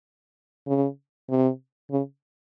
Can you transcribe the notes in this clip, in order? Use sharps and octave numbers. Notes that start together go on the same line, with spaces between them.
C#3
C3
C#3